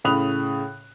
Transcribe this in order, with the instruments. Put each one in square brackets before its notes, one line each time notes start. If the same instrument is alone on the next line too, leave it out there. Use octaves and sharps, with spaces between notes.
[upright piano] A2 C#3 B5 D#6 F#6 F7